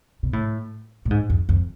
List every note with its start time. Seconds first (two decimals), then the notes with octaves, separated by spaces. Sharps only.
0.23 B2
0.33 A2
1.05 A2
1.11 G#2
1.30 F2
1.49 F2